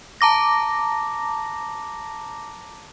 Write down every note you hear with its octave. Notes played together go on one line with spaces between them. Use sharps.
A5 A#5 D6 A#6